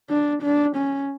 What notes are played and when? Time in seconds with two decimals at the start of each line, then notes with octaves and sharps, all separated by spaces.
0.10 D4
0.43 D4
0.76 C#4